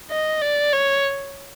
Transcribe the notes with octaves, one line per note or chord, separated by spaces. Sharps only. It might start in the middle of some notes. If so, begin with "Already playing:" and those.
D#5
D5
C#5